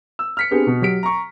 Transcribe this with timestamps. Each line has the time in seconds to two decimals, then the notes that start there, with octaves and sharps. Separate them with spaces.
0.19 E6
0.37 F6 B6 C#7
0.51 B3 C4 D4 G4 G#4 B4
0.67 B2
0.82 F#3 G4 B6 D7
1.03 A#5 C#6